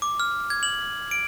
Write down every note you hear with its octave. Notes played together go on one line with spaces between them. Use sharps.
D6
F6
G#6
F#7
D7